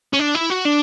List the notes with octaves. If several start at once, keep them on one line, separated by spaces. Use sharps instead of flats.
C#4
D4
E4
F#4
D4